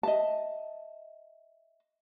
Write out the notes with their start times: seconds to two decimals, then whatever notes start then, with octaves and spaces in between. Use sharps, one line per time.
0.03 D#5 E5 A5